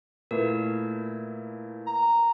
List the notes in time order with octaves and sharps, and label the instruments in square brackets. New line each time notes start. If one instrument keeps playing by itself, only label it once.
[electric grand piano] A#2 A3 E4 [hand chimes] A#4 B4
[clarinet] A#5